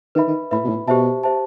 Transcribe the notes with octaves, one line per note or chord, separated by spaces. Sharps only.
D#3 B4 E5 B5
D#3
A2 B4 E5 B5
B2
A2
B2 G4 C5 E5 A5
G4 C5 E5 A5